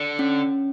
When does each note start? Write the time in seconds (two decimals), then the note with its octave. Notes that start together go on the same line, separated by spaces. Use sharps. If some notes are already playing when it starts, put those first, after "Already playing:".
Already playing: D3
0.19 C#4